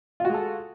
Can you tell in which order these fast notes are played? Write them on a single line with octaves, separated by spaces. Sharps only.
F4 F#4 G#3 A4